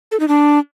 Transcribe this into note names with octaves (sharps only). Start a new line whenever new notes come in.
A4
D#4
D4